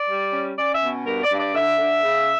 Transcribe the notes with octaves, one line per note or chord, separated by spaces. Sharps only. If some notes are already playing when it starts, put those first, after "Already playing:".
Already playing: D5
G3
C#4
C#4 D5
E5
B2
G2 A#4
D5
G2
D5
D3 E5
D3
C#3